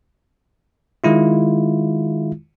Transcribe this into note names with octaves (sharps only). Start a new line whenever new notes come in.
D#3 G#3 E4 F4